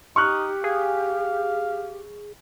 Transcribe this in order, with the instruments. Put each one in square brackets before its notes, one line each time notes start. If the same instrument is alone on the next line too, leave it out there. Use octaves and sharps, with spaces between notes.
[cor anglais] D#4 [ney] G4 [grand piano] C#6 F6 F#6
[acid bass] G#4 [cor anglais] F5